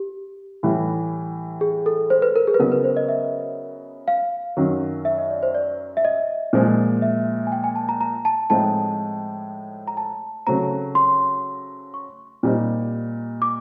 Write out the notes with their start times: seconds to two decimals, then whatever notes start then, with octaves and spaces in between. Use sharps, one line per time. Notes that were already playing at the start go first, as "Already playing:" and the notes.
Already playing: G4
0.63 A2 E3 G3
1.61 G#4
1.86 A4
2.10 C5
2.22 B4
2.36 A#4
2.48 G#4
2.54 B4
2.59 C#3 F#3 B3 D#4 A#4
2.72 B4
2.84 C5
2.97 D#5
3.09 E5
4.08 F5
4.57 F#2 D#3 F#3
5.05 E5
5.18 D#5
5.30 D5
5.43 C5
5.55 D5
5.97 E5
6.05 D#5
6.53 A#2 F3 G#3
7.02 E5
7.47 G#5
7.52 G5
7.64 G#5
7.76 A5
7.89 A#5
8.01 A#5
8.25 A5
8.50 A2 F3 G#3 C4 D#4 A5
9.88 A#5
9.97 A5
10.47 C#3 F#3 A3 C4 A#5
10.95 C6
11.94 C#6
12.43 A#2 G3 C4 D#4
13.42 D6